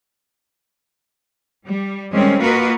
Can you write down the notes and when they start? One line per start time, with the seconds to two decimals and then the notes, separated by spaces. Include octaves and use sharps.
1.66 G3
2.12 D#3 G3 G#3 C4 C#4
2.41 A#3 F4 F#4 A#4 B4 D#5